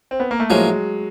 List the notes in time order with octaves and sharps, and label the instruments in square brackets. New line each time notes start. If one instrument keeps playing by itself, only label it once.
[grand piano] C4
B3
A#3
A3
[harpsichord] A2 F3 A#3 C#4 [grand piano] F#3 G#3